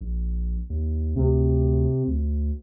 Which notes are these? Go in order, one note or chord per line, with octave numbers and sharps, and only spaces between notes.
A#1
D#2
D2 C3
D2